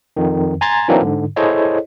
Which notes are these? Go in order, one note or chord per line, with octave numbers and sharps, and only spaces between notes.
F2 D#3
G#5 A#5 C6 G#6 A6
E3 F#3 A#3 C4 D4 D#4
G#2 D3
E4 G#4 A4 C5 C#5 D#5